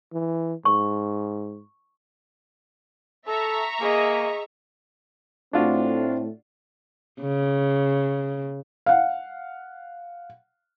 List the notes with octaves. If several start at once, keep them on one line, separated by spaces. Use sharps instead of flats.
E3
G#2 C#6
A4 E5 A#5 C#6
A#3 G#4 D#5
A2 A3 C4 D4 F4 F#4
C#3
F5 F#5